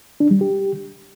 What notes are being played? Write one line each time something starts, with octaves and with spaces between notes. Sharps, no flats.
D4
G3
G4